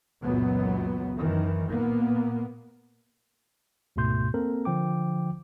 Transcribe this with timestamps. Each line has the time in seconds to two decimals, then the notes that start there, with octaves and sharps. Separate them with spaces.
0.22 C#2 F#2 A#2 E3 F#3 B3
1.18 F#2 D#3 E3
1.67 A#2 A#3 B3
3.96 D2 G#2 B2 A3 C6 G6
4.34 A#3 C4 A4 A#4
4.65 D3 F3 G5 D6